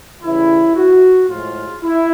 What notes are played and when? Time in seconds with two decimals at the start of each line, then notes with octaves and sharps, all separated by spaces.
0.23 C#3 E3 G3 E4
0.76 F#4
1.29 A2 F3 G#3 F4
1.83 E4